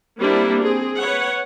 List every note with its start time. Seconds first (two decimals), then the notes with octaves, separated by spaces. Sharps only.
0.20 G3 A#3 C4 D4 E4
0.61 C4 G#4
0.99 B4 C#5 F#5